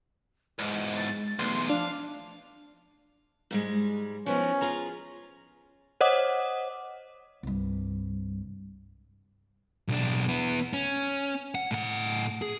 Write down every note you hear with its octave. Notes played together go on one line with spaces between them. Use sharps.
E2 G#2 G#3
A6
B1 E2 A3 C6
F3 D4 F5
G#2 G3 G#3
F3 B3 C#4 D#4
F4 G#4 A#5
C5 C#5 D#5 F#5 D6 D#6
C2 G2
B1 D4
B3 E4
C#4
F#5
A2 F#5
G#4